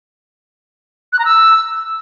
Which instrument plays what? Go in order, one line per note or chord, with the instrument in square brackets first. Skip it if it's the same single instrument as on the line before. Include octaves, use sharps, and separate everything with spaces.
[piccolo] F#6
A#5
E6